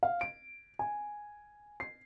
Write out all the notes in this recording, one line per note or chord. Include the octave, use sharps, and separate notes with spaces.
F5
D7
G#5
C7